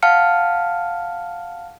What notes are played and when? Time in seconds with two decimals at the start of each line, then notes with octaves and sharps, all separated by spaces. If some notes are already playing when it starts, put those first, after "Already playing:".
0.03 F5 F#5 A5 F6 C#7